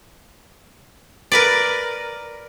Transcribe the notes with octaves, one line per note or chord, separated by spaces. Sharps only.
A#4 B4 D5